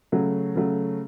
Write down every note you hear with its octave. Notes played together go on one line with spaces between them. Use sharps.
C#3 F#3 A3
C#3 F#3 A3